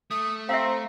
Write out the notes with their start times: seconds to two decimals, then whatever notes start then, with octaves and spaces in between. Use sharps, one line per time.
0.11 A3 D#6
0.49 C4 E5 F5 A#5